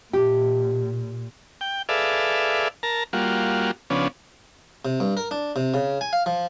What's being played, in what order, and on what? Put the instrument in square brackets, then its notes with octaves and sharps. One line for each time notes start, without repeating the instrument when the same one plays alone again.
[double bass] A#2 [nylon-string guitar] G4
[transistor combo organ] G5
G#4 A4 B4 D5 E5 F5
A#4 A5 A#5
G3 A#3 F4 F#4
C#3 F3 B3 C#4 D4
[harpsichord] C3
G2
A#4
D4
C3
C#3
G#5
F5
F3